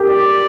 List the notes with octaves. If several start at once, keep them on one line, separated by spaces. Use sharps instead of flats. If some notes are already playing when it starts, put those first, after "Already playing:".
Already playing: G4 A#4
D5